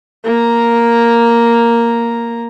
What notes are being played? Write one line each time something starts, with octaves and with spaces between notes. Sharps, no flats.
A#3 A#5